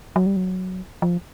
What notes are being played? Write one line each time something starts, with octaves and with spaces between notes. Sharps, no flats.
F#3
G3
F#3
F3